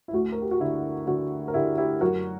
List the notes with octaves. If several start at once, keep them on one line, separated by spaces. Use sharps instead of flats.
E4
D2 F#4
A#4
G4
F#4
D3 E4
D3 F#4
A#4
D3 E4 G4
E4 G4
F#2 F#4 A#4